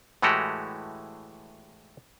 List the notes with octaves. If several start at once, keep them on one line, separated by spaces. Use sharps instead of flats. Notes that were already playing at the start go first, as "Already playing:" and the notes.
A2 E3 G#3 A3 F#4 G4